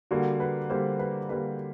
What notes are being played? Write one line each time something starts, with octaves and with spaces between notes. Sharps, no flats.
D3 G3 A#3 F#4
B4
D3 G3 A#3 C5
B4
D3 G3 A#3 B4